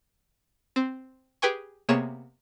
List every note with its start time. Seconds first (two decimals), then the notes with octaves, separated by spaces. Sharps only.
0.76 C4
1.42 G4 G#4 B4 G5 G#5 C#6
1.89 C3 A#3 B3 G#4 C#5 E7